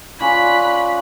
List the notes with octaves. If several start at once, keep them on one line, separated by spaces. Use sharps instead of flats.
C#4 F4 D5 B5 F#6